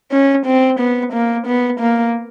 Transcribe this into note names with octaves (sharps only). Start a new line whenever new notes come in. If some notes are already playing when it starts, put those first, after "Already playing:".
C#4
C4
B3
A#3
B3
A#3